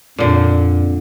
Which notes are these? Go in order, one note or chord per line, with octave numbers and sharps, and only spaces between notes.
F2 A#2 D3